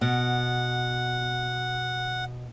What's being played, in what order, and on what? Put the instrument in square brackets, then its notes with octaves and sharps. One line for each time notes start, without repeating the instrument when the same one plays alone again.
[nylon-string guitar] B2 [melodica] F#5